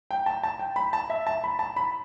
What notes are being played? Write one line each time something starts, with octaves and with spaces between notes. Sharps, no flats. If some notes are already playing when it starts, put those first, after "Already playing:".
G5
A5
A5
G5
B5
A5
E5
A5
B5
A5
B5